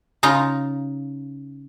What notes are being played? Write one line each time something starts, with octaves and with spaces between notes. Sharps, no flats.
C#3 D#4 F4 A#5